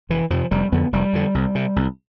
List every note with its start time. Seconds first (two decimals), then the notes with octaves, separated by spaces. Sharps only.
0.10 F1 E3
0.30 F2 C3 F3
0.51 F1 G3
0.72 F2 D3 B3
0.92 F1 G3
1.13 F2 D3
1.35 C2
1.55 C3
1.76 C2